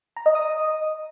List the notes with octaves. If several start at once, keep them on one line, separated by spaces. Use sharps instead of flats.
A#5
D#5
D#6